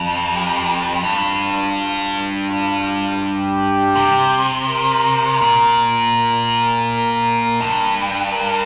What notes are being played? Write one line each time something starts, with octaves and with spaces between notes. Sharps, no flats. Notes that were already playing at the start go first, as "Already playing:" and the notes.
Already playing: F2
G4
G2 F4
F4
G4
C3
A#4
A#2
A#4
G2
A#4